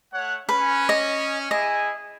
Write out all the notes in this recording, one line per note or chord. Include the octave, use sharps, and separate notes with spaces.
A3 C#5 F#5
C#4 B4
D#5
E4 G#4 D#5 G#5